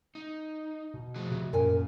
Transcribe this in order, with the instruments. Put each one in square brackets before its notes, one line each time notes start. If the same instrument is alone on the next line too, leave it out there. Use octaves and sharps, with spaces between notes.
[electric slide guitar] D#4
[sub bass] B2
[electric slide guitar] F3 F#4 G#4
[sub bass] C3
[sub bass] F#2 [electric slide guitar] A#2 [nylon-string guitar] A#4 G#5